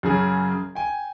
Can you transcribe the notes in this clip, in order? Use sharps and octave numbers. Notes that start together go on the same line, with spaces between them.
F#2 C#3 G#4
G5 G#5